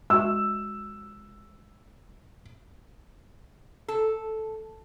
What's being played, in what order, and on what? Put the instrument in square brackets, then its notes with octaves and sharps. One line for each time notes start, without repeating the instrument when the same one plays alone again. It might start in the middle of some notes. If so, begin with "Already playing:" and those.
[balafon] G#3 F#4 E5 [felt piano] E6
[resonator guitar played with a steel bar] A4